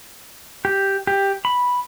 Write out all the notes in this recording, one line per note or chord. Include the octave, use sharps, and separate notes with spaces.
G4
G4
B5